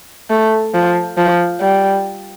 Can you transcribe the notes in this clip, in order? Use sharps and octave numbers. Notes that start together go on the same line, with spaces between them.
A3
F3
F3
G3